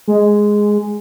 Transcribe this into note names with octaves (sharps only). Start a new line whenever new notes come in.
G#3